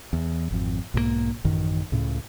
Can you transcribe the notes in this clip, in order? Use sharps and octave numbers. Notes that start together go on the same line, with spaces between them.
E2
G#1 F2
B1 G#2 E3 A#3
A1 F#2 D#3
C#2 A2 C#3